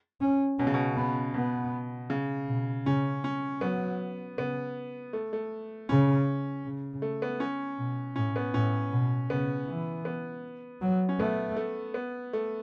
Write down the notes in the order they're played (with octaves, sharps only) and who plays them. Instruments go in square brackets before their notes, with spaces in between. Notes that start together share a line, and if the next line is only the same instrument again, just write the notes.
[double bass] C#4
[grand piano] B2 [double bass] C#4
[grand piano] C#3
B2
[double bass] B3
[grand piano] B2 [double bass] B3
[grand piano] C#3
[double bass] B2
[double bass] C#3 [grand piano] C#4
[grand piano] C#4
[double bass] F#3 [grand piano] B3
[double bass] C#3 [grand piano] B3
[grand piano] A3
A3
[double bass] C#3 [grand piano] C#4
[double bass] C#3
[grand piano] A3
B3
C#4
[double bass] B2
[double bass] A2 [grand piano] C#4
[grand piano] B3
[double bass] A2 [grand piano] C#4
[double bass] B2
[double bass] C#3 [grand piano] B3
[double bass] E3
[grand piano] B3
[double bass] F#3
[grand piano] C#4
[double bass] A3 [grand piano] B3
[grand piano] A3
B3
A3